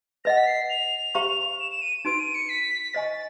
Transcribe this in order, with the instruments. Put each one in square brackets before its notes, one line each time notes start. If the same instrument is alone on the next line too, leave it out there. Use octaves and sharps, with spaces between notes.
[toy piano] B4 D#5 F#5 [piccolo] A#6
[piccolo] B6
C7
F7
[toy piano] G4 C5 F5 A#5 C#6
[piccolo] E7
E7
D#7
[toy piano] D#4 F#4 B4 [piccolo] D7
[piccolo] D#7
C#7
B6
[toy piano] C5 D#5 G#5 C#6 [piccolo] A6